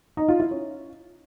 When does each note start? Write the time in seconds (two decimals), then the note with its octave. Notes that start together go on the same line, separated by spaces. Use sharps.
0.17 D#4
0.28 F4
0.40 E4
0.51 C#4